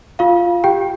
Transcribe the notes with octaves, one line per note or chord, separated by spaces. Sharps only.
F4 F5
G4 G5